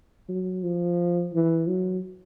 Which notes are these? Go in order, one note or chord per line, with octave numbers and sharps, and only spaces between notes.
F#3
F3
E3
F#3